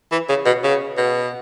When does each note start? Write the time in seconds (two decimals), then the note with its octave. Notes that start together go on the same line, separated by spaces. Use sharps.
0.12 E3
0.29 C#3
0.46 B2
0.63 C#3
0.97 B2